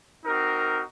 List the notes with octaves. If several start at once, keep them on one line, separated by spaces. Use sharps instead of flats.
C4 D#4 F#4 A#4